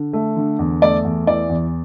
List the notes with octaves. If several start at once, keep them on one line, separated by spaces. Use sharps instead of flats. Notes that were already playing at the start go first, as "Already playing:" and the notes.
Already playing: D3
A3
D3
E2
A3 D5
E2
E3 D5
E2